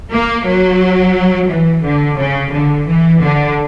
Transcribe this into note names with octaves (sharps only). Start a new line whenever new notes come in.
A#3
F#3
E3
D3
C#3
D3
E3
D3